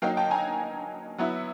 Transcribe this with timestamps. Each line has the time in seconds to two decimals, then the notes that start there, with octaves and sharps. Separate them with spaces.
0.02 F#3 A#3 D#4 F5 G5
0.17 G5 A5
0.31 G#5 A#5
1.18 F#3 B3 E4